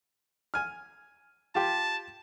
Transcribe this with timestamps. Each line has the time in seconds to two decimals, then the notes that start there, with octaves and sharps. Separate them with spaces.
0.54 G#5 F6
1.55 F4 G4 A5